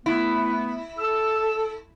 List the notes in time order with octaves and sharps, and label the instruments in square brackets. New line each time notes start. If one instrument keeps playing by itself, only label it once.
[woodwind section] A3 B3 [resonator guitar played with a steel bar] E4
[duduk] A4 [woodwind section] E6